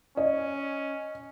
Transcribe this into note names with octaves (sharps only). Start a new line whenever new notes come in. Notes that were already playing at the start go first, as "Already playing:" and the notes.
C#4 D#5